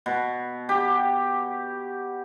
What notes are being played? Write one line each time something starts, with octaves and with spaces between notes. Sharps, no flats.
B2
G4